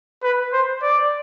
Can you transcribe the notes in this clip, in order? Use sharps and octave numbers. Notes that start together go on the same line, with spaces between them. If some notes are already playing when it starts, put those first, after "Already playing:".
B4
C5
D5